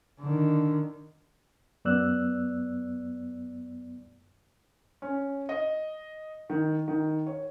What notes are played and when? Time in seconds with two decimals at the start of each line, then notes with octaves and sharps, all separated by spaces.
0.20 D3 D#3
1.85 F#2 B3 D5 E6 F#6
5.02 C#4
5.49 D#5
6.50 D#3
6.88 D#3
7.27 C#5